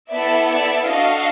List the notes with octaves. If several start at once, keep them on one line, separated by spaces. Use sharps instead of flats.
B3 E4 A4 D5 E5
D5 E5
D4 F#4 A4 D#5 F5